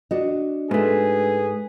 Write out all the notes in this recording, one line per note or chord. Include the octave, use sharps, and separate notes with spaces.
D4 F#4 D#5
G#2 A3 G#4 B4